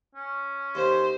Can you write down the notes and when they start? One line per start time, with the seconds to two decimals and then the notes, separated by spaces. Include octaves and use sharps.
0.15 C#4
0.75 D#2 C5